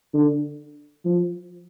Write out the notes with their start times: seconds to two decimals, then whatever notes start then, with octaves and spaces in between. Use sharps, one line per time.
0.14 D3
1.05 F3